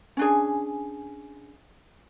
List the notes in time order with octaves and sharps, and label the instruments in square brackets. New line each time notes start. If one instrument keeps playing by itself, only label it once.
[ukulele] C#4 D4 G#4